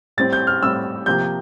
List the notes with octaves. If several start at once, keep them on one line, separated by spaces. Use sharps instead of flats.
A2 G3 C4 A6
G6
F6
A2 G3 C4 E6
C3 F3 A#3 G6